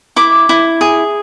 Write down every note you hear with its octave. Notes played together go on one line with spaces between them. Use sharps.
E4 D6
E4
G#4